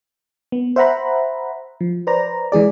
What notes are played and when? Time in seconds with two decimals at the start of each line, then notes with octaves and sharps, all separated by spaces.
0.52 B3
0.76 C5 E5 F#5 A#5 B5
1.81 F3
2.07 B4 C5 D5 A#5
2.52 E3 G#3 G#4 D5